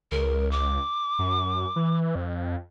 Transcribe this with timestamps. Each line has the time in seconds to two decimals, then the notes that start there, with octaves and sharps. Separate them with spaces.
0.12 C#2 A#4
0.51 D6
1.19 F#2
1.76 E3
2.15 F2